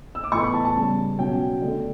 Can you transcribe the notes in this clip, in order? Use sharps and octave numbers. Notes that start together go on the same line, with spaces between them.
E6
D6
A2 E3 B3 C#6
B5
A5
A5
C#3 G3 B3
B2 F#3 C#4 G5
D3 A3 D4